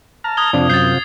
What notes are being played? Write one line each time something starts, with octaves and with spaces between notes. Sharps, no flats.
A5 A#5 F6
D#6 G#6 G7
F2 C3 D4 F4
F#2 G6 A6 C7